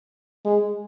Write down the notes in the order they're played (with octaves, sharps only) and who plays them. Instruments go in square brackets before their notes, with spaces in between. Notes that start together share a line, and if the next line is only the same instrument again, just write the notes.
[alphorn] G#3